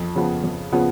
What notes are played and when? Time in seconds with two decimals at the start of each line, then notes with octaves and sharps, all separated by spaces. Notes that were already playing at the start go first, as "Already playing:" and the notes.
Already playing: F2
0.15 C#3 F3 B3
0.44 F2
0.72 C#3 F3 B3